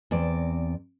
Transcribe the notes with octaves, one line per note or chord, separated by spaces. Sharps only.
E2 C4 D5